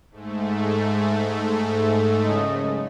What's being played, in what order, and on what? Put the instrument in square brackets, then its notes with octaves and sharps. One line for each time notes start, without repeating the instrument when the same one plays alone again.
[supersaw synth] G#2 A3
[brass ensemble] A4
F#1 C#3 D#5